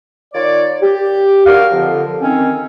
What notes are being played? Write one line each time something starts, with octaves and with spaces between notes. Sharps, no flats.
D#3 F4 C#5 D5
G4
D4 F#4 A#4 F5
F2 D3 F3
D#3 C4 C#4